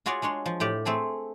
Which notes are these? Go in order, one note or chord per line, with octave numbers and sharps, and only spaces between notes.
F4 F#4 G#4 C#5 D5
G#3 D4 C#5 C6
F3
A2 G4 D5
A3 C4 G#4 A4